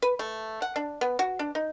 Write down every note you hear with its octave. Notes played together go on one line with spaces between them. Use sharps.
B4
A3
F#5
D4
B3
F#4
D4
D#4